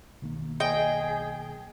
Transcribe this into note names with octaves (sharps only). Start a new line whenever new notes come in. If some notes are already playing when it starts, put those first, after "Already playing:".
B1 D#3 A#3
G#4 D#5 G5